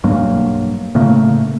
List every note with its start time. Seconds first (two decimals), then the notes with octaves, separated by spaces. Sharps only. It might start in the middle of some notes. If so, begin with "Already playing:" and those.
0.04 B1 G2 F#3 A#3
0.95 A2 C#3 A3 A#3